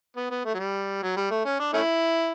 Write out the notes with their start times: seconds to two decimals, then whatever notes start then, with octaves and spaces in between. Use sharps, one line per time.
0.16 B3
0.31 B3
0.45 A3
0.54 F#3
0.59 G3
1.02 F#3
1.17 G3
1.31 A3
1.45 C#4
1.59 D4
1.74 A3 C#4 E4